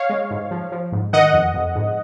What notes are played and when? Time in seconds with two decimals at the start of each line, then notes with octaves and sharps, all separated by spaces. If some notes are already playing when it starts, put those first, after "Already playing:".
Already playing: C#5 F5
0.10 G#3
0.31 G#2
0.51 F3
0.72 F3
0.92 G#2
1.13 D#3 D#5 F#5
1.33 F2
1.54 F2
1.76 G#2